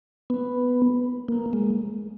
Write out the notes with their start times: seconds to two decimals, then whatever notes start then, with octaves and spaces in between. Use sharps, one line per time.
0.30 B3
1.28 A#3
1.53 G#3